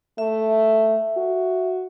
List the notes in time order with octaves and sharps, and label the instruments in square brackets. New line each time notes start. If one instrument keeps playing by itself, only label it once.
[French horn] A3 [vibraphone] E5
[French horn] F#4